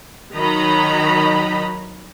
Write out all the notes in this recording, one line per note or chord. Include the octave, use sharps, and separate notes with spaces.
D#3 F#3 D#4 D#5 A#5 B5